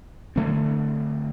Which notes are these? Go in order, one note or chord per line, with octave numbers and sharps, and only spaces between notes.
D3 A3 C4